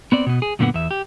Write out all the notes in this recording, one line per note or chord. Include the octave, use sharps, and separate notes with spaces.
B3 C4 D5
B2 B3
G#4
F#2 A#2 D3 A#3 B3 F#5
E2 E5
G4